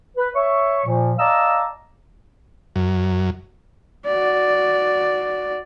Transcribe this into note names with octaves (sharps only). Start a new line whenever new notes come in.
B4
C#5 E5 C#6
A#2 F3
D5 D#5 F5 A5 A#5 E6
F#2
F#4 D5